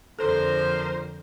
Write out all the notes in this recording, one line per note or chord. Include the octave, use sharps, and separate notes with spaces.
F2 D3 F3 A4 A#4 C5